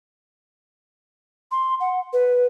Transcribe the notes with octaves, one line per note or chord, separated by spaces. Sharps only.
C6
F#5
B4